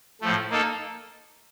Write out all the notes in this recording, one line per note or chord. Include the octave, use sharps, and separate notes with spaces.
A2 F3 A3
A#3 D#4 A4